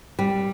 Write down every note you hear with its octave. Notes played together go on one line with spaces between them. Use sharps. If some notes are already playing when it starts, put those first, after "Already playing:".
G3